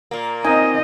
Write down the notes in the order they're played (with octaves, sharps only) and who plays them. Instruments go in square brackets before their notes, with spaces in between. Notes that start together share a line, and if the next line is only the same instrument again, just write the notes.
[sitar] A#2 A#3
[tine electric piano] C4 A#4 G#5 [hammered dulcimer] D#4 [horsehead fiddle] D#5